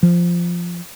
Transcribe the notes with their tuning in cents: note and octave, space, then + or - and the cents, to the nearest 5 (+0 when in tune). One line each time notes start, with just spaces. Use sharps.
F3 -5